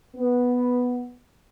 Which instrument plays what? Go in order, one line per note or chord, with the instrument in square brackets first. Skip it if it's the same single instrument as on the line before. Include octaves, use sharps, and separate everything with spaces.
[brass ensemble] B3